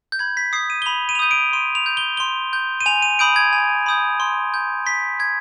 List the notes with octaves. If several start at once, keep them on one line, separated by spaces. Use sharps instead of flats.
G6
B5 G#6
B6
D#6 G6 C7
D#7
G7
B5 F7
D#7
F7
D#6 G6 D#7
D7
C6 D#7
F7
G6
G7
C6 G7
G6
D#7
G#5 F7
D#7
B5 D#6 G6 D7
G#6
G#5
B5 D#6 G6
C6
G6
C6 B6
G6 G#6